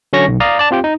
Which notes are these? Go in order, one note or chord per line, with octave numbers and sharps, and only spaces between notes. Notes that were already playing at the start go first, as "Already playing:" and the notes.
D3 F#3 C#4 C#6 A#6
B1
D5 F5 A#5 D#6
D5 A5
C4 F4 G4 G5
D#4